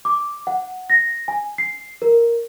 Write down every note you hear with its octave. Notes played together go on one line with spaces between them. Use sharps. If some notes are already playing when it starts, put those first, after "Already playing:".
D6
F#5
A#6
G#5
C7
A#4